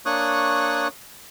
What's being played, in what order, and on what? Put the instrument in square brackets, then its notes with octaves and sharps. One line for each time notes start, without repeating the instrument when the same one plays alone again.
[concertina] A#3 D4 C#5 C#6 D#6 F#6